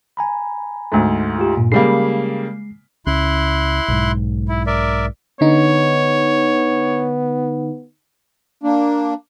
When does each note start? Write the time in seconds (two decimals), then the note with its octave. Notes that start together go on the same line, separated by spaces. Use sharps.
0.17 G#5 A#5 B5
0.92 D2 G#2
1.39 F4 G4
1.57 G2 A#2
1.72 C#3 G3 G#3 A#3 C7
3.06 C#2 C#4 E4 C6 F#6
3.88 B1 G#2
4.49 E4
4.67 A#4 D5 E5
5.41 D3 B3 D#4 C#5
8.63 A#3 D4